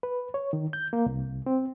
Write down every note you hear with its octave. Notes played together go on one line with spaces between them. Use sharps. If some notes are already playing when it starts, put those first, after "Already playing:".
B4
C#5
D#3
G6
A#3
C2
C4